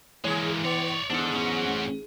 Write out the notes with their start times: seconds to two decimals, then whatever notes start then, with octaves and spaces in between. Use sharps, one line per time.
0.24 E3 G#3 A#3 G#4 C#5
0.64 B3 C#5 D5
1.10 E2 G#2 D4 A4
1.35 E2 C#4 F#4
1.67 A1